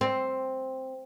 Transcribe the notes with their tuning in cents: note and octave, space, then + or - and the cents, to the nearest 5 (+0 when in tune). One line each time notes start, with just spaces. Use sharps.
C4 +5